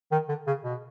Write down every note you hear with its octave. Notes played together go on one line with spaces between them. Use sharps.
D#3
D3
C#3
B2